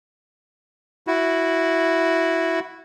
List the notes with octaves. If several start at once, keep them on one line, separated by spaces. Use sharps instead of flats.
E4 F#4